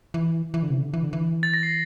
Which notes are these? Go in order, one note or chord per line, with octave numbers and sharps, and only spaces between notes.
E3
E3
D3
C3
D3
E3
D3
E3
A6
A#6
C7